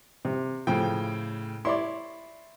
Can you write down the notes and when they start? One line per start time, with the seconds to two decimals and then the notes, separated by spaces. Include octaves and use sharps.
0.25 C3
0.67 A2 C#3 F3 G5
1.65 E4 C#5 D5 C6